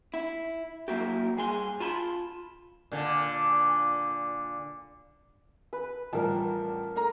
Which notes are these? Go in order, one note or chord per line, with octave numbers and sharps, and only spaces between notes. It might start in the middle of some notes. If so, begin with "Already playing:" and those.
E4
F#3 A#3 E4 F#4 G4
G2 G#4 C6
F4 A5 B5 C6
A#2 D3
B4
A1 F3 G3 A#4 A5
A3 A#4 A#5